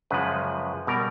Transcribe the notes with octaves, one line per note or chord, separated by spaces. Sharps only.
F#2 C#3 F3 G#3 B4
B2 G3 A#4